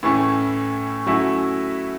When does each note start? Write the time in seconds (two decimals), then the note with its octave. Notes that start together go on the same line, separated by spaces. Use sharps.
0.03 A2 E3 A3 C#4
1.06 F#3 A3 C#4 E4